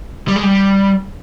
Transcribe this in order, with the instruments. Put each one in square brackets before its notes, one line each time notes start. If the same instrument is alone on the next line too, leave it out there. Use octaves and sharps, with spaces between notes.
[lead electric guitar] G3
G#3
G3